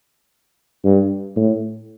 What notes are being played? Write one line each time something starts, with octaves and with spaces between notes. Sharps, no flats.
G2
A2